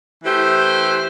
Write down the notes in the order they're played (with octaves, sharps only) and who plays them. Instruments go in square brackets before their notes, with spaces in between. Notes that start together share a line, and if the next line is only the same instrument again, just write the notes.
[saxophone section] E3 A3 G4 C5